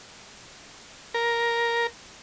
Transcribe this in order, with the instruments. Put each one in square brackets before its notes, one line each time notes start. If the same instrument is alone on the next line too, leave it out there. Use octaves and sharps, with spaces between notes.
[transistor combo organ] A#4